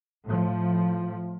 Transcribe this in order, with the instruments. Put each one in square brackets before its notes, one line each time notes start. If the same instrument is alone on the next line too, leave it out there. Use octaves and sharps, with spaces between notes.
[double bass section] A2 F3